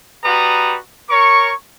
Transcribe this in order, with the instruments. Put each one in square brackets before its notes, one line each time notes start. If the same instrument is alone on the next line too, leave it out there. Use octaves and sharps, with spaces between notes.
[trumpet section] G3 F#4 B4 A#5 D#6
A#4 C#5 C#6